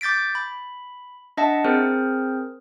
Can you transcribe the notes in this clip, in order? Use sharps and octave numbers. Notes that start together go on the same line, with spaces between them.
D6 G6 A6 B6 D7
B5
D4 D#5 E5 F#5 A5
C4 G#4 A#4 C5